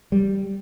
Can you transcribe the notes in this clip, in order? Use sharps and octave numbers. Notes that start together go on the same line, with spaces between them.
G3